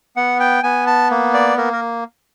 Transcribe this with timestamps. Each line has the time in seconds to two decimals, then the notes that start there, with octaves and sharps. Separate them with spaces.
0.16 B3 F#5
0.40 G5
0.63 B3 G#5
0.87 A5
1.11 A#3
1.34 D5
1.58 A#3 A#4
1.73 A#4